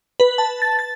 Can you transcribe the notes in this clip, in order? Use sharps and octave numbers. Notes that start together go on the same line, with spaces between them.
B4
A5
A6
A6